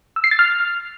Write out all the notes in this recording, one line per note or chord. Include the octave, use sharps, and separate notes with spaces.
E6
C7
A6
F6